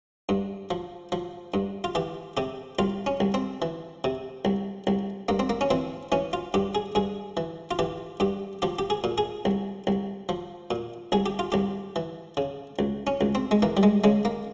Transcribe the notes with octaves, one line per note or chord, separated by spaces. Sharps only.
G2
F3
F3
G2
F4
E3 G4
C3 G4
C2 F4
C#4
C2
C4
E3
C3
C2
C2
G2 A#3
C4
A#3
C#4
E3 C4
E3 C#4
F4
G2 G4
G#4
G2 G#4
E3
F4
E3 G4
G2 G4
F3 G4
G4
G#4
A#2
G#4
C2
C2
F3
A#2
C2 G#4
G4
F4
C2 G4
E3
C#3
C#2
C#4
C#2
C4
G#3
E3 A#3
G3
G#3
C#3 G#3
A#3